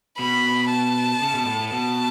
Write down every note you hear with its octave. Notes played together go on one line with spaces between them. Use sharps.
B2 B5
A5
C#3
B2
A2
A2
B2 A5